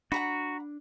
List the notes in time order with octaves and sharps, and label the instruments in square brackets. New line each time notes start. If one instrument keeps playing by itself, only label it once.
[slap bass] D4 [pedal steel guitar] F#4 [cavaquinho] F#5 A#5 B5